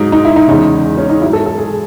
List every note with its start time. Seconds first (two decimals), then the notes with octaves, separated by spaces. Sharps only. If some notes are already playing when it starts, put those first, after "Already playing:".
Already playing: G#2 F#3 D#4
0.12 D#4
0.25 E4
0.36 D#4
0.48 E2 C#3 G#3 D#4
0.97 C#4
1.10 D#4
1.22 F#3 E4
1.25 G#2
1.33 A4
1.46 A4
1.58 G#4